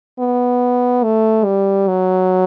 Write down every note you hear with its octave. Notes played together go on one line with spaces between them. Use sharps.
B3
A3
G3
F#3